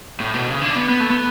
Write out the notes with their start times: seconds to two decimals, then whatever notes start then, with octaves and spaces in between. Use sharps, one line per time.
0.20 A2
0.34 B2
0.48 C#3
0.62 D3
0.75 B3
0.89 B3
1.00 A3
1.10 B3